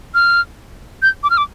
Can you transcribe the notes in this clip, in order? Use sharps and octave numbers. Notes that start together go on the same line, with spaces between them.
F6
G6
D6
F6
D6